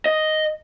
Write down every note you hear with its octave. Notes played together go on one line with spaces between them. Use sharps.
D#5